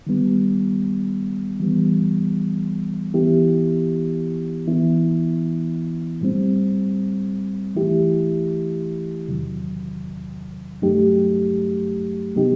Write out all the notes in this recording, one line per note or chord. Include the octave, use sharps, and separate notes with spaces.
D#3 G3 B3
E3 G3 B3
E3 B3 E4 G4
E3 B3 E4
A2 G3 C4
E3 A3 E4 G4
E2 C3 D#3 F#3
G2 F#3 A3 D#4 G4
C3 F#3 B3 D#4 G4